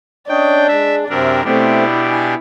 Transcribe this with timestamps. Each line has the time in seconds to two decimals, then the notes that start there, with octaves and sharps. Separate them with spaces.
0.29 C#4 D4 C#5 D#5 G5
0.68 G#3 E5
1.10 F#2 C3 C4 D4 A#4 E5
1.45 B2 A3 C4 D4 E4 G4
2.10 G#5